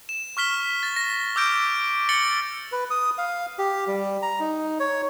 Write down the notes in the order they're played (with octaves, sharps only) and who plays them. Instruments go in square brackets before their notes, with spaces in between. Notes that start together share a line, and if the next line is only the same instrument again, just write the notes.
[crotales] E7
C#6 F6 B6 G7
A6
A#6
D6 E6 F6 G6 A#6 D7
A6 C#7 F#7 G7
[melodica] B4
D#6
F5
G4
G3
A#5
D#4
C#5